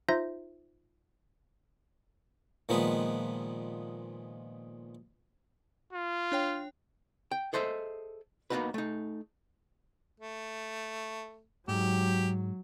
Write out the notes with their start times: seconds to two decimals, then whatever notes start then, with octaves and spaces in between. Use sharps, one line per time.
0.09 D#4 F4 C5 E5 G6 A#6
2.69 A#2 D#3 F3 G#3 B3 B4
5.93 F4
6.32 D4 C#5 G5
7.31 G5
7.53 G#4 A4 C5 D#5 E5
8.50 A#3 B3 D4 D#4 F#4 B4
8.74 A3 D#4
10.20 A3
11.68 G#2 F#3 G4